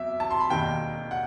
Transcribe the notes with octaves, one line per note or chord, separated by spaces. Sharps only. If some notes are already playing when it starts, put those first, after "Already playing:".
Already playing: E2 F#3 E5
A5
C6
B5
E1 D#2 D#3 G5
F#5